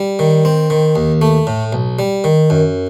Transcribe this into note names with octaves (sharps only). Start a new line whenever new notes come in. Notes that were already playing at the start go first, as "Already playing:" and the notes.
Already playing: G3
D#3
C4
D#3
D#2
A3
A2
B1
G3
D#3
F#2